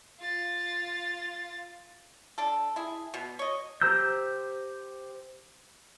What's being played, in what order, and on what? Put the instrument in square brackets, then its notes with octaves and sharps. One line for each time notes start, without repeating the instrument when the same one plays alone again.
[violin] F4 A6
[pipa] D4 A4
E4 G#4
B2
C#5 D#5
[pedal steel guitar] G4 C5 A#5 E6 G6